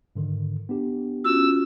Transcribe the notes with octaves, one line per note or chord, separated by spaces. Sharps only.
G#2 D3 D#3
B3 D4 G4
C#4 F4 F#4 E6